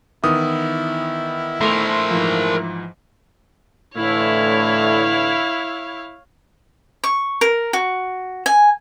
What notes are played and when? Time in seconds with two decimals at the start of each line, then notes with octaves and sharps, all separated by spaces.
0.24 D#3 E3 B3 E4 D#6
1.61 A3 A#4 C5
2.11 G#2 E3 F3
3.97 A2 D3 E3 E4 C#5 F5
7.04 C#6
7.41 A#4
7.73 F#4
8.46 G#5